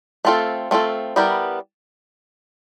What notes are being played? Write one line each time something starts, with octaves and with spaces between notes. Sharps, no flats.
A3 C4 F4 A4
A3 C4 F4 A4
G3 B3 E4 G4 A#4